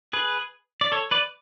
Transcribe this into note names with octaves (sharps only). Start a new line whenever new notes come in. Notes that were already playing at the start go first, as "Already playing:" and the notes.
G#4 B4
D5
A4 C#5
B4 D5